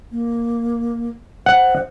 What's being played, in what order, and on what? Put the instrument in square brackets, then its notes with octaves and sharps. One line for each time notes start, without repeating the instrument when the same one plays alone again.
[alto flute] A#3
[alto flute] C5 [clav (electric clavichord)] F#5